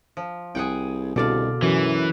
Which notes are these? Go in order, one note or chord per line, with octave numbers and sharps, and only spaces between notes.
F3
C2 G#4 F#5 G5
C2 B2 D3 D5 F5
F#2 E3